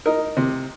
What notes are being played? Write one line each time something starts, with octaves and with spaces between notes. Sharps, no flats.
D#4 A#4
C3